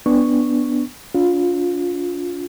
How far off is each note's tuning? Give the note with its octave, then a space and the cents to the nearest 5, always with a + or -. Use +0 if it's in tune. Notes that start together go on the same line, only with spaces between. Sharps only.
B3 +0 D4 +0 C#6 +0
D4 -40 F4 +20